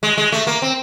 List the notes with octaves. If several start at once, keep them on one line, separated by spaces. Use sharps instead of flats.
G#3
G#3
A3
A#3
C4